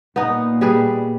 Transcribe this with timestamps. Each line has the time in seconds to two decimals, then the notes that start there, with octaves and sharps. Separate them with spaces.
0.16 A#2 B3 D#4
0.61 G3 G#4 B4